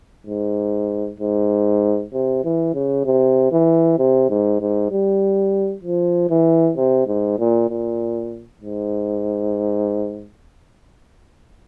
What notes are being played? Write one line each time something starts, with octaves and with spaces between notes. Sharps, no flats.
G#2
G#2
C3
E3
C#3
C3
E3
C3
G#2
G#2
G3
F3
E3
C3
G#2
A#2
A#2
G#2